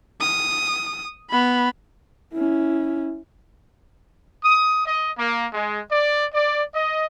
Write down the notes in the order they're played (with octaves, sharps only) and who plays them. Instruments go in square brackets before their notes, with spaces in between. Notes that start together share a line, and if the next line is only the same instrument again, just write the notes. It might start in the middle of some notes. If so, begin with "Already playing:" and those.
[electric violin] D#6
B3 B5
[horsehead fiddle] C#4 E4
[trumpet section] D#6
D#5
A#3
G#3
D5
D5
D#5